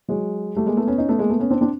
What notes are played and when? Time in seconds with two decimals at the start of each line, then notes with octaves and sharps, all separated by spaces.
0.08 F#3 G#3
0.56 G3 A3
0.66 G#3 A#3
0.77 A3 B3
0.87 B3 C#4
0.98 C#4 D#4
1.09 A3 B3
1.19 G#3 A#3
1.29 A3 B3
1.40 B3 C#4
1.51 C4 D4
1.61 C4 D4